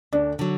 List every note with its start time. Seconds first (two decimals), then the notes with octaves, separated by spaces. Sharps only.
0.13 D2 D4
0.39 D3 F#3